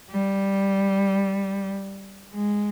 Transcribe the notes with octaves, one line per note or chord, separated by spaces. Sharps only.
G3
G#3